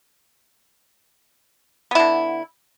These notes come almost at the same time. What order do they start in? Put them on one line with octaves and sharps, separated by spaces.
B3 E4 D3